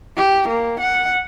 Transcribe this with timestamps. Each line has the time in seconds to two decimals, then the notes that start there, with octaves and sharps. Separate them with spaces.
0.17 G4
0.48 A#3
0.80 F#5